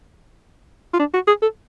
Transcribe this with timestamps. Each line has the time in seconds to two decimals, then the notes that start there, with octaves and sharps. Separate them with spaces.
0.94 F4
0.99 D4
1.14 F#4
1.27 G#4
1.42 A4